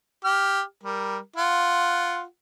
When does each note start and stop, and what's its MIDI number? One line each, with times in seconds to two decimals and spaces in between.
0.25 0.61 67
0.25 0.61 79
0.25 0.61 89
0.83 1.18 55
0.83 1.18 70
1.36 2.23 65
1.36 2.23 78